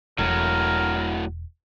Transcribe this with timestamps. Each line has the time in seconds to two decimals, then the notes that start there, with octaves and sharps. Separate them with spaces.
0.18 E1 A2 F#3 A#4